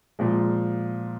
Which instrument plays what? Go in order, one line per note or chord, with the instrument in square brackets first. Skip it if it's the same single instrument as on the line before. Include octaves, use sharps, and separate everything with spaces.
[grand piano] A#2 F3 G#3